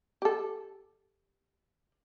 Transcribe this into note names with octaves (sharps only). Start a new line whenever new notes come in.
G4 A4